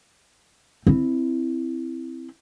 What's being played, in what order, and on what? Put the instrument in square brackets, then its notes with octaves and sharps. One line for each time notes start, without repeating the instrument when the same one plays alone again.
[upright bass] C4 E4